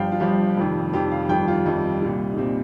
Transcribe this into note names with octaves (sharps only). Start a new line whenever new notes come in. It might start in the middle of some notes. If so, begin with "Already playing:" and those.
Already playing: G1 G2 F3 F5 G5
F4
G1 G2 F3 G4
F1 F2 D#3
F1 F2 D#3 G4
F5
G1 F2 D#3 G3 G5
F4
G1 F2 D#3 G3 D#4
C2 A#2 G3
D#4
A#2 G3 C4